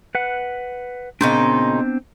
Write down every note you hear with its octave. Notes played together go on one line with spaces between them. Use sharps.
B4 F#5
A#2 C#3 B3 C4 D4 D#4